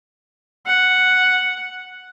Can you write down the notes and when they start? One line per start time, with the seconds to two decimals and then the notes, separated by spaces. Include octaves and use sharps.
0.66 F#5